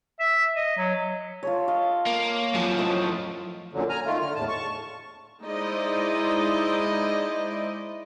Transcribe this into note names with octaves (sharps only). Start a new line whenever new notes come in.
E5
D#5
F#3
F4 A4 C#5
D#5 F5
A#3
F#2 F3
A2 A3 D#5
F#2 A#2 D3 F#3
G#5 A#5 F6
D#3 A3 F4
D3 F6
E2 A2 A5
A5 C#6
G#3 D#4 E4 C5 D5 D#5